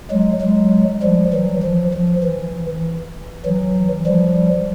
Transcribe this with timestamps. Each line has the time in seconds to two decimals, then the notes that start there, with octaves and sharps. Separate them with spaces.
0.11 F#3 G#3
0.41 F#3 G#3
1.03 F3 G3
1.34 E3 F#3
1.63 F3
1.94 F3
2.24 E3
3.46 E3 F#3
4.06 F3 G3